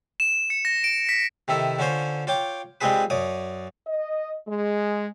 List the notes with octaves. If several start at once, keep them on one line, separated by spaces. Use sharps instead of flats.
E7
C#7
A#6
D7
B6
C3 D#3 E4 A4
D3 C#4 F4 C5 C#5
F4 C#5 G5 D6
G3 G#3 C4 F4 G#4 B4
F#2 C#5 D5 D#6
D#5
G#3